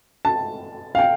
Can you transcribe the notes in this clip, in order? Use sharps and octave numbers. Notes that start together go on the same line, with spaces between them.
A5
F5
G5